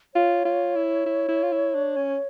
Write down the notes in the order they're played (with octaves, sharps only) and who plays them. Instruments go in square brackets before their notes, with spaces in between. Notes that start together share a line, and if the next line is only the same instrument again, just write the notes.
[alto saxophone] F4 [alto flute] C#5
[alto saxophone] F4
E4
E4
E4
F4
E4
D4
C#4